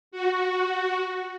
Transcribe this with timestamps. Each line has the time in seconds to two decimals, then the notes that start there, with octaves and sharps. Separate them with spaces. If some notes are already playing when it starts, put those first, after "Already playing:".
0.12 F#4